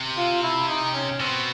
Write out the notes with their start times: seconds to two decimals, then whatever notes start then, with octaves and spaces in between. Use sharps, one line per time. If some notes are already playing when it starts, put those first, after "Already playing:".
Already playing: C3
0.17 F4
0.43 E4
0.68 D#4
0.94 C#4
1.20 B2 C4